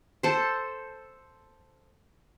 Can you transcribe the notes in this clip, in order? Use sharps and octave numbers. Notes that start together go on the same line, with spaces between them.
A4 C5